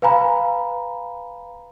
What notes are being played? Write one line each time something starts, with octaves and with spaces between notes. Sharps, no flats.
B4 F5 G#5 A#5 B5